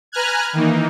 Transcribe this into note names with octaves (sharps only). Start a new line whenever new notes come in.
B4 G#5 A#5 F6 F#6 G#6
D#3 E3 A#3 D#4